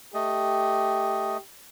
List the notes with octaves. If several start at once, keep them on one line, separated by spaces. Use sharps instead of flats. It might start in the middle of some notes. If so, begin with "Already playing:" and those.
A3 G4 D#5